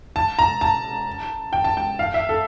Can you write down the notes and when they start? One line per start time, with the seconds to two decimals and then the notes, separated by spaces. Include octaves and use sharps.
0.16 A5
0.39 A#5
0.61 A5
1.53 G5
1.64 A5
1.77 G5
1.99 F5
2.14 E5
2.29 A4